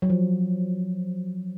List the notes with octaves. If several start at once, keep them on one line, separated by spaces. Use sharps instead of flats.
F#3
F3